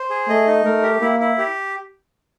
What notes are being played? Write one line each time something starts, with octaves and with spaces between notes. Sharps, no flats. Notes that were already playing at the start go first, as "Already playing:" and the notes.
Already playing: C5
G#4
A3 D#5
D#4
A3 A#4
G4
A#3 E4
E4
G4